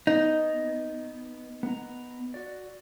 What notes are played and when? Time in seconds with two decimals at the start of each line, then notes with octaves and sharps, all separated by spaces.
0.07 B3 D#4
1.63 B3 A#5
2.34 F#4 D5